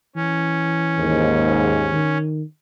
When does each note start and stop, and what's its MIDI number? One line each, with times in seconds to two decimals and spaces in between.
0.16 1.39 52
0.16 2.18 61
0.99 1.98 39
0.99 1.98 44
1.92 2.43 51